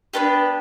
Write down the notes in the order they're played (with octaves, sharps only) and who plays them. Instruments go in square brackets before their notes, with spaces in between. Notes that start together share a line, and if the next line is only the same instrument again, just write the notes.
[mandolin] B3 D4 G4 B4